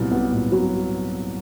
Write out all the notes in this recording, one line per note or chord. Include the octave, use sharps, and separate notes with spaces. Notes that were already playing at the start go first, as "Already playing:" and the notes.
Already playing: C2 A#2 F#3 B3
B3
A#2
F#3